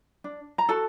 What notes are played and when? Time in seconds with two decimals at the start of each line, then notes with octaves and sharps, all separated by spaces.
0.24 D4
0.58 A#5
0.69 F#4 A4 A5